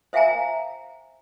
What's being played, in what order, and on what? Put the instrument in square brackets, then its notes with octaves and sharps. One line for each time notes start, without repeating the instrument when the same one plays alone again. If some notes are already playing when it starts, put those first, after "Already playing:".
[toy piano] C5 E5 F5 G5 G#5 A#5